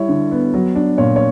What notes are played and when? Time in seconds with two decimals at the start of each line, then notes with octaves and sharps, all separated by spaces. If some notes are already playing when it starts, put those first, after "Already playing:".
Already playing: G3 E4 C#5
0.08 D3
0.31 B3
0.54 F#3
0.75 D4
0.98 A#2 C#5
1.16 C#5